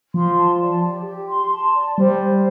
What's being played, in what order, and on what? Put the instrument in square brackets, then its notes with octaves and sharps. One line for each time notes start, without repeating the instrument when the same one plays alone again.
[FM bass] F3 [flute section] C6
[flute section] A5
D5
G4
G4
C6
A5
D5
[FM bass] G3 [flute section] C5
[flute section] C5